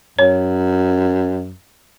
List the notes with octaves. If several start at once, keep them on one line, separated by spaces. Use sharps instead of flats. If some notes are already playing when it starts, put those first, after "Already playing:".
F#2 C#5